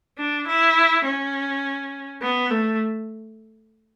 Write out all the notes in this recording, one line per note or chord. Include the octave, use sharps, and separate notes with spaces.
D4
E4
C#4
B3
A3